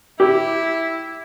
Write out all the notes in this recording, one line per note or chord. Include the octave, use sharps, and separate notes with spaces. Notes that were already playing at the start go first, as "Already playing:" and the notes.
E4 G4